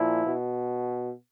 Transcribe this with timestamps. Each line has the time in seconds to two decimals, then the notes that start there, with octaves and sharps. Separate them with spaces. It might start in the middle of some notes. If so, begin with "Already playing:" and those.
Already playing: A#2 F3 E4
0.26 B2